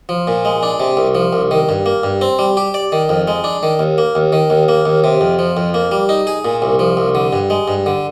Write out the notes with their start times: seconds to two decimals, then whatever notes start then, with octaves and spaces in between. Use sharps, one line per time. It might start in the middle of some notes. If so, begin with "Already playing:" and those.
0.09 F3
0.28 A#2
0.45 G#3
0.63 D4
0.80 C3
0.97 C2
1.15 F3
1.33 C2
1.51 D#3
1.69 G2
1.86 A#3
2.03 G2
2.21 C4
2.39 G3
2.57 G4
2.74 D5
2.92 D#3
3.09 F2
3.28 G#3
3.44 D4
3.63 D#3
3.79 D#2
3.98 A#3
4.15 D#2
4.33 D#3
4.50 D#2
4.69 A#3
4.85 D#2
5.04 C3
5.21 F2
5.39 F3
5.57 F2
5.74 A#3
5.91 G3
6.09 D#4
6.27 G#4
6.45 A#2
6.62 C2
6.79 F3
6.97 C2
7.15 D3
7.33 G2
7.50 G#3
7.68 G2
7.86 D3